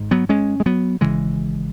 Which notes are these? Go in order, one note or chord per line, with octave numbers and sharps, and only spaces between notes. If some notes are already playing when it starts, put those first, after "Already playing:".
Already playing: G#1 G#2
F#3 B3
G#3 C#4
G#3
F#3 B3
G#1 F#2 C#3 E3 G#3